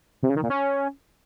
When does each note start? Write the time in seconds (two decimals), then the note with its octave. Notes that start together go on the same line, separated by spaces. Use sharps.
0.23 C3
0.29 C#3
0.36 D#3
0.43 A#2
0.50 C#4